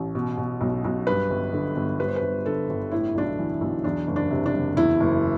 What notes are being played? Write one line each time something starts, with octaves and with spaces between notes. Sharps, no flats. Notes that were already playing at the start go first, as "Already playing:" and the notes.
Already playing: A1
B2
B2
B1
B1
G2 B4
G1
D3
G1
G2 B4
C5
B4
G1
D3 A4
G1
A2 E4
B1 D4
E4
E3
B1
E2 D4
F#1
D4
C3
D4
F#1
E2 E4
F#1